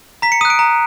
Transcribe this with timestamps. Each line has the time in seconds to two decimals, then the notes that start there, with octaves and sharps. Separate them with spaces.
0.22 A#5 B6
0.32 C#7
0.41 D#6 F#6 D#7
0.50 D7
0.59 A#5